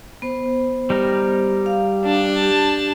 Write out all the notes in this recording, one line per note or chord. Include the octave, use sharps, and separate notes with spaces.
B3 C5
G3 D#4 A#4
F5
D4 A5
G4